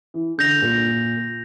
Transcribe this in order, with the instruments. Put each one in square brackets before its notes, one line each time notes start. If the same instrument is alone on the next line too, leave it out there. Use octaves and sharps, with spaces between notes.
[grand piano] E3
[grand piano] D3 [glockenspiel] G6 A#6 F7
[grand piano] A#2